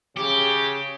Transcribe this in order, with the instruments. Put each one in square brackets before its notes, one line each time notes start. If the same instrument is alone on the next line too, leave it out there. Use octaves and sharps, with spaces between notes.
[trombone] C#3 [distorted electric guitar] G4